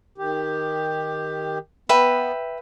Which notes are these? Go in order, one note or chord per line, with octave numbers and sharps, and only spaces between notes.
D#3 G4
B3 B4 E5 G5